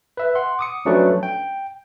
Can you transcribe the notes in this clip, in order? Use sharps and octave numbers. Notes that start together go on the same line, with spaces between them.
B4 E5
F#5 C6
D6 D#6 C#7
F3 F#3 A3 C#4 D4 B4
G5